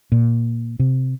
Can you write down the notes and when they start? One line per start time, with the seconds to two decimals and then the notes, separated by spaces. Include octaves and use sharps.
0.12 A#2
0.79 C3